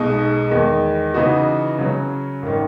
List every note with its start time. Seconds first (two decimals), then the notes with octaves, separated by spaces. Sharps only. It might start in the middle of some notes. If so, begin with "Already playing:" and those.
Already playing: B1 B2 G#3 D#4
0.51 E2 D#3 G#3
1.14 C#3 E3 B3 D#4 F#4
1.78 C#3 F#3 C#4
2.42 G#1 D#3